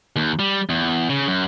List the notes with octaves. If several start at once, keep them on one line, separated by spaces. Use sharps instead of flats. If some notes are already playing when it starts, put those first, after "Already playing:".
D#2
G3
E2
C#3
F#2